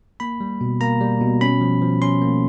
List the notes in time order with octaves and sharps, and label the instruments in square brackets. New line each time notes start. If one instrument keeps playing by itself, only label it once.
[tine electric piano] A#3 B5
G3
B2
A#3 A#5
G3
B2
C#4 B5
F3
F3
C#4 C6
A#3